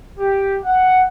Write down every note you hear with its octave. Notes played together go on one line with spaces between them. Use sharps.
G4
F#5